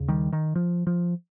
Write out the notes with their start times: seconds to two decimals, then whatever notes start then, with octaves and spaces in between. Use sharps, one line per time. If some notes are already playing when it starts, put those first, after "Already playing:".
Already playing: D#2 C#3
0.08 D#3 G3
0.32 D#3
0.55 F3
0.87 F3